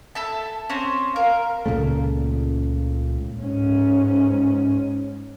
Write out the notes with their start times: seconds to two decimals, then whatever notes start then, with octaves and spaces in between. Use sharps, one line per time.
0.15 A4 E5 A5
0.70 C4 C#4
1.16 A#4 F5
1.66 C#2 A#2 C#3 A3
3.43 G#2 C#4